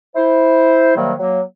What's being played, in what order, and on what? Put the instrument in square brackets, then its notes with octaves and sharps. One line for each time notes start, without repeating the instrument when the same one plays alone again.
[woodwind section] E4 C5
C3 D#3 F#3 G3 A#3
F#3 A#3